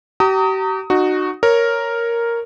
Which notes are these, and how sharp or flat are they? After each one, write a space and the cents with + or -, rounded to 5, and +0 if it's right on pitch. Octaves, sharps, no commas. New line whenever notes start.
G4 -40 A#5 -30 D#6 +20
D#4 -30 F#4 +0
A#4 +0 C#5 +0